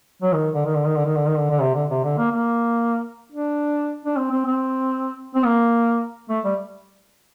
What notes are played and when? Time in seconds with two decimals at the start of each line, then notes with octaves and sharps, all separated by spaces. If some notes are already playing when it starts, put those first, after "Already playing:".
0.22 F#3
0.34 D#3
0.54 D3
0.65 D#3
0.75 D3
0.86 D#3
0.96 D3
1.06 D#3
1.16 D3
1.26 D#3
1.37 D3
1.50 D3
1.61 C3
1.75 D3
1.90 C3
2.04 D3
2.18 A#3
2.32 A#3
3.32 D4
4.05 D4
4.17 C4
4.31 C4
4.46 C4
5.35 C4
5.45 A#3
6.30 A3
6.44 G3